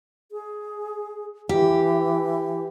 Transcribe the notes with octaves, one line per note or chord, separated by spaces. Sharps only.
G#4
E3 G4